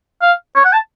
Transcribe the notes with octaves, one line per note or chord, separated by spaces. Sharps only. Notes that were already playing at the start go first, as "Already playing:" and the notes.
F5
C#5
F#5
A5